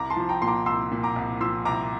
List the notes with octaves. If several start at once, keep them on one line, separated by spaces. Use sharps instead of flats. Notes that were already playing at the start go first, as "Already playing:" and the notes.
Already playing: C2 A#5 D6
A5 C6
F3
G5 A#5
A#2 C6
A#5 D6
C2 C6 E6
A#2
A#5 D6
C2
F3 C6 E6
C2 A#5 D6